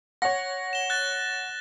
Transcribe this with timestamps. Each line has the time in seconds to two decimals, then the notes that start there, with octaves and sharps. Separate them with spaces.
0.22 C#5 F#5 A#6
0.73 E7 G7
0.90 F#6 A6